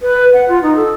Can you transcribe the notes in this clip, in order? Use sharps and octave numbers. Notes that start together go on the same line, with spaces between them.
B4
F#5
F4
D#4
A4